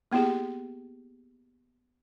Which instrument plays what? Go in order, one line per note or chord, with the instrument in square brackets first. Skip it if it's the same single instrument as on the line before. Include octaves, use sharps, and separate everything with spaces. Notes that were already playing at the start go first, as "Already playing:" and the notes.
[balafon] A#3 B3 E4 G4 G#4